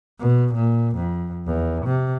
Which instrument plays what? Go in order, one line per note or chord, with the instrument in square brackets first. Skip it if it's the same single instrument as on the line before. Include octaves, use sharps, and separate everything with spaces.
[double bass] B2
A#2
F2
E2
C3